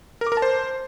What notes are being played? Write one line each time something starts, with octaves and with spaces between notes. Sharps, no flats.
A#4
D6
A#4
A5
C5